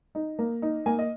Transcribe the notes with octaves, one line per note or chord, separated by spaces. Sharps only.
D#4
A#3
D#4
A#3 G#5
D#5